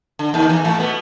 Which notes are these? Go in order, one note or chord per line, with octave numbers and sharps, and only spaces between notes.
D3
D#2 D#3
E2 E3
A2 A3
B2 B3